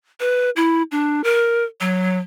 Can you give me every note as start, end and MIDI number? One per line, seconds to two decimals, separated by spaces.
0.20 0.50 71
0.56 0.82 64
0.91 1.24 62
1.24 1.64 70
1.81 2.18 54